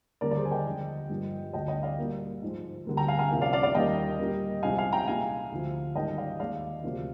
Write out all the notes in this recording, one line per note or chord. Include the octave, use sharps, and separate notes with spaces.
D#2 D3 G3 A#3 A#4 D5
D5
G#4 C5
G#5
D#5 G5
F2 D3 F3 G#3
G2 F3 A#3
D2 D3 G#3 D#5 G5
D#5 G5
D5 F5
A#2 G3 A#3
G#2 F3 G#3
D2 D3 G3 A#3
G5 A#5
F5 G#5
F5 G#5
C2 C3 F3 A#3
D5 F5
D5 F5
D5 F5
D#2 D#3 G3 A#3 D#5 G5
A#2 G3 A#3
C2 C3 F3 G#3 F5 G#5
F5 G#5
G5 A#5
C2 A#2 G#3 F5 G#5
D2 D3 F3
G#2 D#3 G3 A#3 D#5 G5
D5 F5
D#2 D#3 G#3 D5 F5
D2 C3 F3 A#3